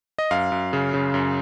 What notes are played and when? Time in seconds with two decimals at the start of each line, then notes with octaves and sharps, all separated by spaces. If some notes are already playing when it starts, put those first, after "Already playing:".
0.19 D#5
0.31 F#2 F5
0.52 F#2
0.73 C#3
0.94 C#3
1.14 F#2